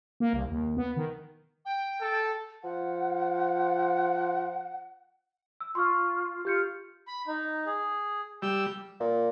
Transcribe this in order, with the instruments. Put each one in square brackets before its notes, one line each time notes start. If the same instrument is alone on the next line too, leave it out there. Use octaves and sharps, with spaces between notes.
[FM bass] A#3
C2
D#2
B3
D#3
[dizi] G5
[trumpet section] A4
[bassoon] F3 [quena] F#5
[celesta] E6
[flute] F4 [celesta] C6 C#6 F6
[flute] F4 [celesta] G4 G6 C#7
[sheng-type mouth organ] B5
D#4
G#4
[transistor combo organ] G3 [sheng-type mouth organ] E6 G6
[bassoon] A#2